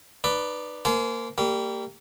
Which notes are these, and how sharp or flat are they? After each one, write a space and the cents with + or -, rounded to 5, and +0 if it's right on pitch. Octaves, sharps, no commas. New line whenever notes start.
D#4 -25 B4 +0 D5 +0
A#3 -15 C5 -30 G#5 +35
G3 +0 A#3 -25